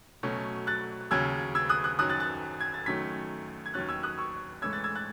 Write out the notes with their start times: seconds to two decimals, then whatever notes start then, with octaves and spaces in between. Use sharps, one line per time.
0.23 B2 F#3 A3 C#4
0.67 F#6 A6
1.11 D#2 C#3 F#3 C#4 E6 G#6
1.55 E6 G#6
1.69 D#6 F#6
1.84 D#6 F#6
1.99 F#2 D#3 F#3 D#6 F#6
2.10 F#6 A6
2.20 F#6 A6
2.61 G#6
2.74 A6
2.86 F#2 D#3 F#3 A3 G#6 B6
3.66 G#6
3.74 D#2 D#3 F#3 C#4 F#6 A6
3.89 E6 G#6
4.03 D#6 F#6
4.18 C#6 E6
4.62 G#2 E3 A3 C#4 E6 G#6
4.73 F#6 A6
4.84 E6 G#6
4.95 F#6 A6